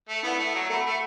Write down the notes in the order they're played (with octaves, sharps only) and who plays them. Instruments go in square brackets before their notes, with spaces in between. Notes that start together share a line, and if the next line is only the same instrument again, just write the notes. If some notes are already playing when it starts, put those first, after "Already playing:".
[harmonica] A3
[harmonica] B3 [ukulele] E4 D5 F#5
[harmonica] A3
F#3
[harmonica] A3 [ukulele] A4 F#5 B5
[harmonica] A3